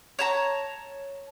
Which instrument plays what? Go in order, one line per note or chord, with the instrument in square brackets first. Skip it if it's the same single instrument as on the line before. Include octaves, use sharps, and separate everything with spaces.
[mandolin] C#5 A5 A#5